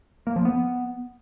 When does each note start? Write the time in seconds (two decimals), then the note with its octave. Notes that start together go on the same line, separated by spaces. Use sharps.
0.27 A#3
0.36 F3
0.45 B3